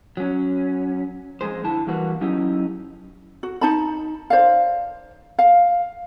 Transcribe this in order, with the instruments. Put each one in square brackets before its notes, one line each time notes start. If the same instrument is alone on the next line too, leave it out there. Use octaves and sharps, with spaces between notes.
[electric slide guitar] F#3 C#4
F2 G#3 G#4 C5
D3 E4 A5
E3 G3 A#3 F#4 B4
F#3 C#4 D#4 E4 G4
[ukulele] F#4
D#4 A5 B5
C5 D5 F5
F5